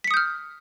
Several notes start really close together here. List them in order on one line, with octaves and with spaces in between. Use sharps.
B6 C#7 D#6 G6 F6